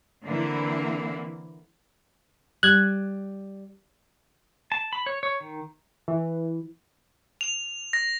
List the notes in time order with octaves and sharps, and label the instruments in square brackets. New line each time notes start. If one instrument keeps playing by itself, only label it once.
[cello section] D3 E3 A#3 C4 E4
[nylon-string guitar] G3 [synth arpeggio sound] F#6 G#6
[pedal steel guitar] A5
B5
C#5
C#5
D#3
[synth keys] E3
[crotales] F7
A#6